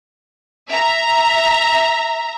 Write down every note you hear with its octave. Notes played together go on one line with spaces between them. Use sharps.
E5 A#5